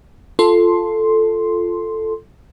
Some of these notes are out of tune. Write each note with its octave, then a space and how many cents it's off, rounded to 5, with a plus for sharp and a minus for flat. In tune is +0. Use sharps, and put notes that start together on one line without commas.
F4 +0 A4 +0 C6 +0